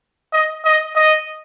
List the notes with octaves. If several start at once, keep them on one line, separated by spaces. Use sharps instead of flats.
D#5
D#5
D#5